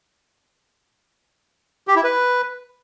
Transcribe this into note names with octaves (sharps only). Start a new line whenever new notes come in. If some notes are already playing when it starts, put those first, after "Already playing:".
G4
E4
B4